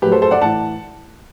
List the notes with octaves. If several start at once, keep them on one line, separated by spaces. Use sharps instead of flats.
A2 F#3 G4 B4
A4 C5
A4 C5
D5 F#5
A2 E3 F#5 A5